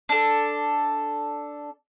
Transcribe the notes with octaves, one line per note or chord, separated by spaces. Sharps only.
D4 A4